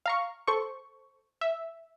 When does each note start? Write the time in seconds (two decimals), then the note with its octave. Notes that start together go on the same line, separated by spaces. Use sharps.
0.06 F5 A#5 C#6
0.47 A4 C5 C#6
1.41 E5